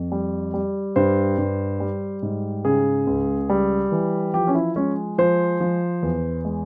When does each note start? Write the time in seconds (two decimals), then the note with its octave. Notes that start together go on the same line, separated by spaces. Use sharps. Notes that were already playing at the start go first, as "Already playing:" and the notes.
Already playing: F2
0.12 G3
0.54 G3
0.96 G2 C5
1.38 G2
1.80 G3
2.22 G#2
2.65 C#3 G#4
3.07 C#2
3.49 G3
3.92 E3
4.34 F3 G4
4.47 C#4
4.55 E4
4.76 G#3 C#4
5.18 F3 C5
5.60 F3
6.03 E2
6.45 G#3